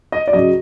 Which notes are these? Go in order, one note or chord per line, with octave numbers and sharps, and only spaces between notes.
D#5
D5
C#3 F#3 D#5